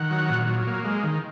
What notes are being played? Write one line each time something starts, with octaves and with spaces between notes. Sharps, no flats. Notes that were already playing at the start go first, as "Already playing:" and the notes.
Already playing: D#3 F#5
F#3
A#2
F#3
A#3
G#3
D#3